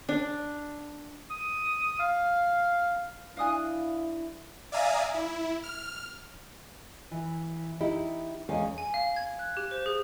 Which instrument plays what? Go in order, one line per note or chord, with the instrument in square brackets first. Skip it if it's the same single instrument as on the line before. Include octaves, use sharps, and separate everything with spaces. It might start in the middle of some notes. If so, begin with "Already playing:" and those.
[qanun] D4
[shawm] D#6
F5
[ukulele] D4 G#5 [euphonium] E4 [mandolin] F5 D#6 F#6
[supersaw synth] D5 E5 F5 G#5 A#5 D#6
E4
F6
[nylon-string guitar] E3
D#4 E4 G4
E2 G#3 C#4 F5
[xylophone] G#5
F5
G#6
F#6
G4
C5
G#4